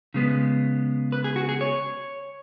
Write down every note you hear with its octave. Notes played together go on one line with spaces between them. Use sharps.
C#3 G#3 B3
B4
G#4
F#4
G#4
C#5